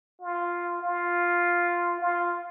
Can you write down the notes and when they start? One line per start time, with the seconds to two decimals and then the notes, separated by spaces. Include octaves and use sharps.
0.22 F4
0.82 F4
2.01 F4